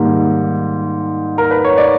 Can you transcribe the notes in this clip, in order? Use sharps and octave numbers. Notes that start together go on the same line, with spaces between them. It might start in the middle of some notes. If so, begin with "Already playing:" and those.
Already playing: G#2 D#3 G3 A#3
A#4
B4
C#5
D5